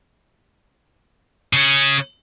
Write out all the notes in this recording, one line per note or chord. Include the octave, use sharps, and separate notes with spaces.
C#3 C#4